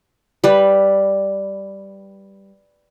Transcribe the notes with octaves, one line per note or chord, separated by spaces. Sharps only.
G3 B4